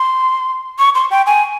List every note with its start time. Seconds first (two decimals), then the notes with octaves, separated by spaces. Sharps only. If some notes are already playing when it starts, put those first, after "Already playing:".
Already playing: C6
0.79 C#6
0.95 C6
1.11 G5
1.26 G#5